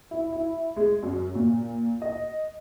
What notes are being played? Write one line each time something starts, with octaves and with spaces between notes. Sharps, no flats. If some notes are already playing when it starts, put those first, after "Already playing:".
E4
E4
G#3
F#2
A#2
D#5